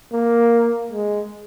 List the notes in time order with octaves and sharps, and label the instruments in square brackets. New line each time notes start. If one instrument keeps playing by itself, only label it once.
[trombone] A#3
G#3